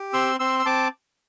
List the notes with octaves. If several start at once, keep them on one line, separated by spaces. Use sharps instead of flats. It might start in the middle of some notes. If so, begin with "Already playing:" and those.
Already playing: G4
C4 C6 E6
C4 C6 E6
E6
C4 A5 D6